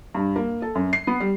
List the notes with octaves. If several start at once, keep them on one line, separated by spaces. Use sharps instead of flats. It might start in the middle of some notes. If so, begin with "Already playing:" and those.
G2
A#3
A4
F#2
C7
B3
G3